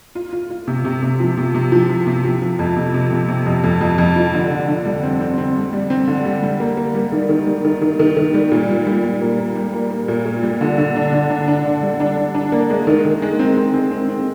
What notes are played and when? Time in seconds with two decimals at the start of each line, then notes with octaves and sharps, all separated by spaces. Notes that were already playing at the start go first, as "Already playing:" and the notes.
0.15 F4
0.33 F4
0.50 F4
0.68 C3
0.85 C3
1.03 C3
1.20 F3
1.37 C3
1.55 C3
1.72 F3
1.89 F3
2.07 C3
2.24 F3
2.42 F3
2.59 F2
2.76 C3
2.94 C3
3.11 C3
3.28 C3
3.46 F2
3.64 F2
3.81 F2
3.98 F2
4.16 F3
4.34 D3
4.51 D3
4.68 D3
4.86 G3
5.03 C4
5.20 C4
5.38 C4
5.55 G3
5.73 G3
5.90 C4
6.07 D3
6.25 G3
6.43 G3
6.60 A#3
6.77 A#3
6.94 G3
7.12 D#3
7.29 D#3
7.47 G3
7.64 D#3
7.82 D#3
8.00 D#3
8.17 D#3
8.34 G3
8.51 A#2
8.69 G3
8.86 G3
9.04 G3
9.21 A#3
9.39 A#3
9.56 G3
9.73 A#3
9.91 A#3
10.08 A#2
10.25 A#2
10.43 G3
10.61 D3
10.78 D3
10.96 D4
11.13 D3
11.30 D4
11.48 D4
11.65 D3
11.83 G3
12.00 D4
12.17 D4
12.35 D4
12.52 A#3
12.70 G#3
12.87 D#3
13.05 D#3
13.22 G#3
13.39 C4
13.57 C4
13.74 C4
13.91 C4
14.09 C4